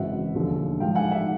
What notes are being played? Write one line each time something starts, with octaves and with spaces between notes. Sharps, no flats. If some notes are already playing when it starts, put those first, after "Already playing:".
Already playing: G#1 F#2 C#3 E3 E5 F#5
E1 D#2 D3 F3
A1 G#2 F3 F5 G5
F#5 G#5
E5 F#5